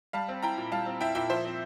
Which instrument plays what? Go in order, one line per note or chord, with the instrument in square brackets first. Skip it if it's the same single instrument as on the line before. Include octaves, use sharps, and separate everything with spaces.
[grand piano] G3 F5 A5
C4
E4 G5 A#5
A#2
G3 F5 A5
C4
E4 E5 G5
A#2 E5 G5
F3 C5 E5
C4